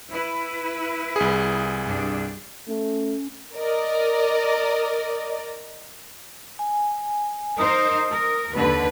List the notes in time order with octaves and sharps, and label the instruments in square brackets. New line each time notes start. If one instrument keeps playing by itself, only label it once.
[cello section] E4 B4
[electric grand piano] C2 G#4
[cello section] G2 D4
[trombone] A3 [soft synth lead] C#4
[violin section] A#4 D5 D#5
[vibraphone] G#5
[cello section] D#4 A#4 C5 [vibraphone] D#6
[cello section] A#4
D#2 D3 B4